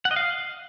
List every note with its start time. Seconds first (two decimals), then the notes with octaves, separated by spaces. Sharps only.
0.05 F#5
0.11 D#5
0.16 F5